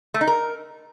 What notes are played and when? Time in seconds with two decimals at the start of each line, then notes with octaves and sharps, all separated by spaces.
0.14 A3
0.21 D#4
0.27 A#4